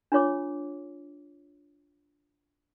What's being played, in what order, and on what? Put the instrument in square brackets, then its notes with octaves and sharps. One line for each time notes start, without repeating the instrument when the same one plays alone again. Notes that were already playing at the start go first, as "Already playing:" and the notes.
[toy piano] D4 F4 C#5 D6